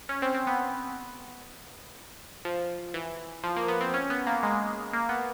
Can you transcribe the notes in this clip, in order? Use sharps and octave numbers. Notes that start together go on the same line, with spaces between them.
C#4
C4
C4
B3
F3
E3
F3
A#3
B3
C4
C#4
B3
A#3
G#3
A#3
B3